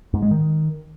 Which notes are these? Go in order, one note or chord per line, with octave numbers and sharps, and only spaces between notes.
G#2
G#3
D#3